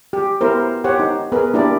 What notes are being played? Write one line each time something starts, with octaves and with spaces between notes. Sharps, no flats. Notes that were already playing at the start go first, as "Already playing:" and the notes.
G4
B3 E4 G4 A#4 C5
G4 C5 C#5 F#5
D#4
B3 G#4 A#4 B4
A#3 D4 E4 G4 A#4 D5